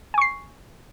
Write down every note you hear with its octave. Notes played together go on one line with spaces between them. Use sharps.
G#5 C#6 C7